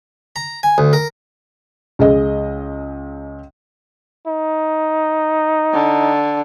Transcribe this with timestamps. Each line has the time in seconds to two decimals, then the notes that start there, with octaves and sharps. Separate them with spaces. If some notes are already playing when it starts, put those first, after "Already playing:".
0.36 A#5
0.63 G#5
0.78 D2
0.93 A#4
1.99 C#2 G#4 D#5
4.27 D#4
5.73 D3